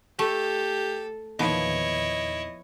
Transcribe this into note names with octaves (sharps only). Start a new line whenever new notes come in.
A3 G4 A4
E2 A#2 D#3 F3 B3 E4 C#5 D#5